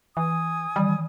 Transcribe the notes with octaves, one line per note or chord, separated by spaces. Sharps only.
E3 G#5 D#6
D#3 E3 G3